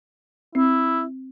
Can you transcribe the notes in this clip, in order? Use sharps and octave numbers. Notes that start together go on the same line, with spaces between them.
C4 E4